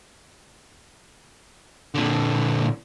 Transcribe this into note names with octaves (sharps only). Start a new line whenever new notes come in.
A#2 D3